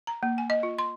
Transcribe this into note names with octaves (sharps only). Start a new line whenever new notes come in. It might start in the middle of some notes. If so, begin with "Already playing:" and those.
A#5
A#3
G#5
D#5
F4
C6